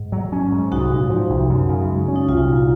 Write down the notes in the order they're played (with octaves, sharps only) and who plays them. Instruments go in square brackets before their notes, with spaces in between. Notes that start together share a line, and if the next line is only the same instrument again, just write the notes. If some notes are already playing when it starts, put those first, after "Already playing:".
Already playing: [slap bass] G#2
F#3
C#4
G#2
[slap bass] C2 [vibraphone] D#4 F#4
[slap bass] A#2
F3
C2
F#2
C#3
G#3
C#4
[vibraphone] D#4
[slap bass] C2 [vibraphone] F4
[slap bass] A#2